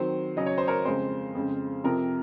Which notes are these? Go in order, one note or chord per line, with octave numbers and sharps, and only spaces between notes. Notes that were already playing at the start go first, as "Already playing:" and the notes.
Already playing: D#3 F#3 C4 C5
C#3 F#3 C#4 D#5
C#5
C5
A#4 C#5
F2 C#3 G#3 C5
F2 C#3 G#3
F2 C3 F3 A#4